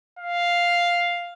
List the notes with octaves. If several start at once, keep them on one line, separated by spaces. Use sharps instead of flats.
F5